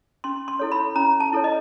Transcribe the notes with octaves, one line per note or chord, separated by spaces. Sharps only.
C#4 C6
C6
E4 A4 C#5
B5
C#4 A#5
A5
E4 A4 C#5
D#5